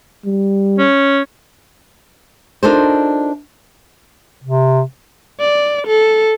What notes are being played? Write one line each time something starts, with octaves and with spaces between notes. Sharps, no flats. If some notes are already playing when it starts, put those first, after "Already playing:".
G3
C#4
D4 D#4 F4 A4 A#4 C5
C3
D5
A4